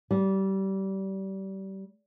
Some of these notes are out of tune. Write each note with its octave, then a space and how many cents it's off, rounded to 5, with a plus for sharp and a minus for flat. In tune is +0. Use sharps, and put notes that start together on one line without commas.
G3 -25